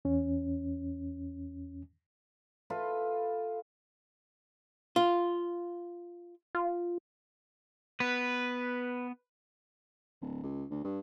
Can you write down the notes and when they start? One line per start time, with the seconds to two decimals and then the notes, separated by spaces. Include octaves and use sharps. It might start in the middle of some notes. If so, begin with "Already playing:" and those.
0.05 E2 C#4
2.70 F4 A4 B4 E5
4.96 F4
6.55 F4
8.00 B3 B4
10.22 D1
10.43 C#2
10.70 D2
10.84 G2